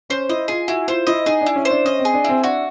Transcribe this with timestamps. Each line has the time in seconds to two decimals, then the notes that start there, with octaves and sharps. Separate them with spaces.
0.10 C#4 C5
0.29 E4 D#5
0.48 F4 G#4
0.68 E4 F#4
0.88 F4 C5
1.07 E4 D#5
1.26 D#4 G#4
1.41 D4
1.46 E4
1.56 C#4
1.65 C5
1.71 D4
1.85 C#4 D#5
1.99 C4
2.05 G#4
2.14 D4
2.24 C4 E4
2.43 D4 F#4